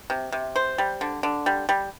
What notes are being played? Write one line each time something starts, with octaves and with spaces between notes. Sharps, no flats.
C3
C3
C5
G3
D3
D3
G3
G3